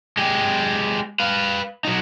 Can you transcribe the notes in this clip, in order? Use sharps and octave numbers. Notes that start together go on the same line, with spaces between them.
G#3 G4
B4 F5
F#3 D#4